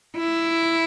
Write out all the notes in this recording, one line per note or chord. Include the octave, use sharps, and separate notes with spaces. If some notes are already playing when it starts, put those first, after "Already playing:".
E4